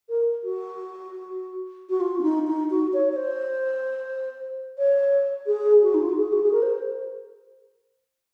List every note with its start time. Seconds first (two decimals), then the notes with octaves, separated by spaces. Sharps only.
0.09 A#4
0.44 F#4
1.90 F#4
2.00 F4
2.19 C#4
2.23 D#4
2.47 D#4
2.70 F#4
2.93 C#5
3.12 C#5
3.16 C5
4.78 C#5
5.46 G#4
5.82 F#4
5.94 D#4
6.02 F4
6.09 F#4
6.17 G#4
6.32 F#4
6.43 G#4
6.52 A#4
6.62 C5